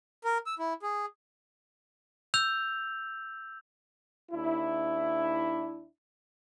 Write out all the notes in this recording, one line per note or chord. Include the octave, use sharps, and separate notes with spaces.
A#4
E6
E4
G#4
E6 G6 F7
D#2 D4 E4